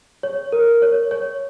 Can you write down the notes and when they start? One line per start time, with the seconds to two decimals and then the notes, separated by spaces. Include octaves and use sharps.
0.23 C#5
0.52 A#4
0.82 C#5
1.11 C#5